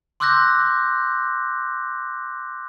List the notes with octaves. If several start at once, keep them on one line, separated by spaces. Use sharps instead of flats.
C6 D6 E6 F#6 G6 A#6